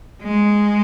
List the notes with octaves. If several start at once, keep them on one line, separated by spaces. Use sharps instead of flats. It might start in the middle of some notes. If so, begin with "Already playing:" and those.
G#3